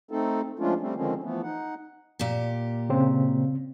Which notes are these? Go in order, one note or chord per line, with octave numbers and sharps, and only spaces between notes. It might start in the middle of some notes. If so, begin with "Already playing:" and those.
A3 C4 D#4 A4
F3 G#3 A3 C#4 D4 F4
G3 A3 C4
D3 D#3 F3 G#3 C4 C#4
E3 F3 A3 B3
D#4 F#5
A#2 G4
C#3 C4